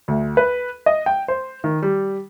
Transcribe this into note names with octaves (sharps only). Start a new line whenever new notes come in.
D2
B4
D#5
G5
C5
D#3
G3